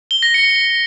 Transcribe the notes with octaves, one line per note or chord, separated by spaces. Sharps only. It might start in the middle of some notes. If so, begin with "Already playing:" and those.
G7
A#6
C#7